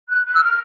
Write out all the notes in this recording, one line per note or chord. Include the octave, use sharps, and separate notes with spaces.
F#6
F#6
E6
F6